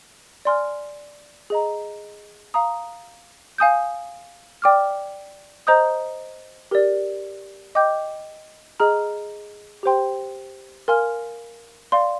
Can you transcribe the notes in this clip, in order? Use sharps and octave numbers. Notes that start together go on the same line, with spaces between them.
D5 G#5 C6 F6
G#4 D#5 A#5
F5 A#5 D#6
F5 G#5 D#6 G6
D5 G5 D6 F6
C5 D#5 A#5 D#6 G6
G4 A#4 D5
D#5 G5 D6 G6
G#4 D#5 A#5 F6
G4 C5 G5 C6
A#4 F5 G#5 C6 F6
D5 F5 C6